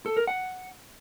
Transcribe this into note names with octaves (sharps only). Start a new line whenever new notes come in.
A4
A#4
F#5